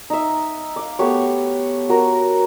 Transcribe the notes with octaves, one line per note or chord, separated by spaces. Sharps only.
D#4 E5
F5 D6
A3 B3 G4 C#5
F#4 A#4